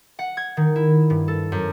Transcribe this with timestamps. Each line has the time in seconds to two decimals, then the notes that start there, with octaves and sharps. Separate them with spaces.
0.19 F#5
0.37 G#6
0.57 D#3
0.76 E4
1.10 G2
1.28 A4
1.52 F#2